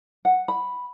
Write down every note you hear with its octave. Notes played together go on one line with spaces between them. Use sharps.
F#5
B5